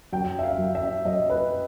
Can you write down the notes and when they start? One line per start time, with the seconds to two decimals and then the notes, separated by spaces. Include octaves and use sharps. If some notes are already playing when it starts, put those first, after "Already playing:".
0.13 F#2 G5
0.39 E5
0.43 F5
0.58 F#2
0.75 E5
1.05 F#2 D#5
1.30 B4